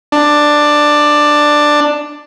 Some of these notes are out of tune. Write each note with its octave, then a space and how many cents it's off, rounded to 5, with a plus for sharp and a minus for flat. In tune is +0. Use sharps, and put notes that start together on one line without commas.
D4 +10